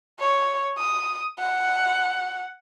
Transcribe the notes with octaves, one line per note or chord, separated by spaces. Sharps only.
C#5
D#6
F#5